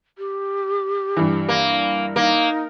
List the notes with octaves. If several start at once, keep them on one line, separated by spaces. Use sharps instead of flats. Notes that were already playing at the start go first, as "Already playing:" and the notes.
G4
G2 E3
A#3
A#3 D#4